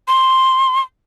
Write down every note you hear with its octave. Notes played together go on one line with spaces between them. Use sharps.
C6